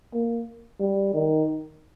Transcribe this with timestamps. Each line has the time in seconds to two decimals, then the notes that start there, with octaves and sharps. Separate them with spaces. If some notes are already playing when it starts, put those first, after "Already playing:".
0.14 A#3
0.80 G3
1.14 D#3